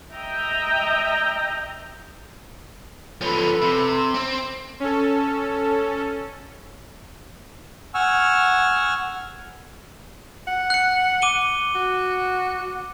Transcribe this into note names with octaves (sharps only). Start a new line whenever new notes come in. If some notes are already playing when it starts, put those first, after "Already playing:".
D#5 E5 G5 A#5
F3 C#4 A4 B4 B5
C3
C4
C#4 A4
F#5 G#5 C#6 E6 F6
F#5
F#6 C#7
D6 D#7 G7
F#4